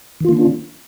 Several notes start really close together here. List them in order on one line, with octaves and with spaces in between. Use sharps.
D#3 F4 A#3 D4 C#4